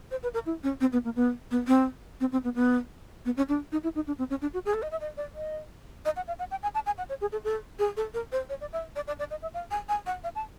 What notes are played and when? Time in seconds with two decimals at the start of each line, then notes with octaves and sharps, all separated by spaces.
0.11 C5
0.23 B4
0.34 A#4
0.46 E4
0.63 C#4
0.81 C4
0.93 B3
1.04 A#3
1.16 B3
1.51 B3
1.68 C4
2.20 C4
2.32 C4
2.44 B3
2.55 B3
3.25 B3
3.37 C#4
3.49 D4
3.72 D#4
3.83 E4
3.95 D#4
4.07 D4
4.18 C4
4.30 C#4
4.42 D4
4.54 F#4
4.65 G#4
4.74 A4
4.82 D#5
4.91 E5
5.01 D#5
5.17 D5
5.35 D#5
6.05 D#5
6.16 F#5
6.27 F5
6.39 F#5
6.51 G5
6.63 G#5
6.74 A5
6.86 G#5
6.98 F#5
7.09 C#5
7.21 G#4
7.32 A4
7.44 A4
7.79 G#4
7.97 A4
8.14 A#4
8.32 C5
8.49 C#5
8.61 D5
8.73 E5
8.96 D5
9.07 D5
9.19 D5
9.30 D#5
9.42 E5
9.54 F5
9.71 G#5
9.89 G#5
10.06 F#5
10.24 F5
10.35 A5